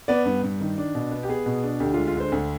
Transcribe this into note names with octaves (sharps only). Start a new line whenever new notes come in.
B3 D5
G2
G2
D#3
D4
B2
B3
G4
B3 G#4
B2
D4
D2 G4
G#3 F4
F4
D3 C5
D2